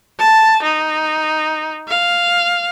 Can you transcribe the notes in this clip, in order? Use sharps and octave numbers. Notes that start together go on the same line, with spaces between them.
A5
D#4
F5